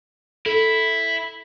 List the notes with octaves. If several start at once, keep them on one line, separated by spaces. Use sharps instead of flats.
E4 A4